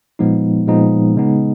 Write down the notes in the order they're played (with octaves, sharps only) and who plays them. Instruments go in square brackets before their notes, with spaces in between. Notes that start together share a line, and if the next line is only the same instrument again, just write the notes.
[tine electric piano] A#2 F3 G#3 B3 D#4
A#2 F3 G#3 B3 D#4
C#3 G#3 B3 D#4